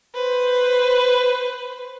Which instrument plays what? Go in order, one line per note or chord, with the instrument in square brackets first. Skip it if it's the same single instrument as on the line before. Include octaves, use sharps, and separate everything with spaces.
[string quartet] B4 C5